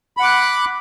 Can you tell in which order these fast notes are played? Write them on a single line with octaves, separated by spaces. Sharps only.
B5 F#5 D6 F#6